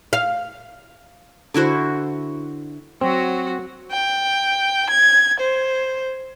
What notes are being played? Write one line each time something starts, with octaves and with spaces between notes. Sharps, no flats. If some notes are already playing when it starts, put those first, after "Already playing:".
F5
D3 E4 F#4 C5
F#3 C4 F#4
G5
G#6
C5